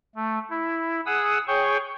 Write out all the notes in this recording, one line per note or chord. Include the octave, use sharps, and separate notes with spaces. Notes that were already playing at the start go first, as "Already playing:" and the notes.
A3
E4
G#4 F#5 D#6 E6
G#4 C#5 G5 C#6